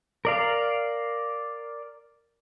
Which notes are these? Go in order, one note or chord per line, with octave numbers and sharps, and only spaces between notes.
A#4 D5 F5